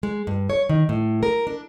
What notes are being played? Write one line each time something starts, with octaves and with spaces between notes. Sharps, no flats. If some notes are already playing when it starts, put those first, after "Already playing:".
G#3
G2
C#5
D#3
A2
A#4
D4